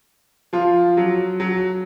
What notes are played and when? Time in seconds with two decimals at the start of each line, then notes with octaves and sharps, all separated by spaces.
0.53 F3 F4
0.97 F#3
1.40 F#3